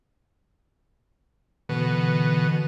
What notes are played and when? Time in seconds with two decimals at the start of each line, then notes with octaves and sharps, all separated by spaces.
1.69 B2 D3 E3